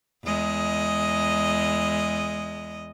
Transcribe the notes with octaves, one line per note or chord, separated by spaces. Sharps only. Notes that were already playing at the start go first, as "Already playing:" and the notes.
E2 G#3 D#5